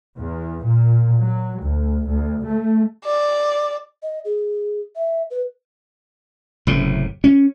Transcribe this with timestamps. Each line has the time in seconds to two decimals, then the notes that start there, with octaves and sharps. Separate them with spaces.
0.16 E2
0.61 A#2
1.21 F#3
1.61 D2
2.06 D2
2.44 A3
3.05 D5
4.03 D#5
4.25 G#4
4.96 E5
5.31 B4
6.67 F#1 A2 C3
7.24 C#4